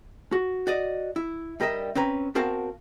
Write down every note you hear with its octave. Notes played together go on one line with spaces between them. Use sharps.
F#4
F#4 D5 D#5
E4
G2 G3 A#4 D#5 E5
C4 C#4 B4 A#5
B3 C4 F#4 A#4 F5 A5